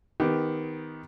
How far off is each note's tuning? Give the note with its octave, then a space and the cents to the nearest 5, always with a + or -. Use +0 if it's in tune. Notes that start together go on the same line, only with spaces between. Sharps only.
D#3 +15 B3 +20 G4 +0